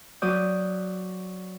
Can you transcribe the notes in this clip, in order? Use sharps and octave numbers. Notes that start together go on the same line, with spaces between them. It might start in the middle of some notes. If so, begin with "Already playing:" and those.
F#3 D5 D#6 G6